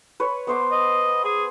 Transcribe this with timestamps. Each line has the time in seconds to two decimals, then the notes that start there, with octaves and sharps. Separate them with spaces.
0.20 B4 C#5
0.47 B3 C5 D6
0.71 D#5
1.25 G#4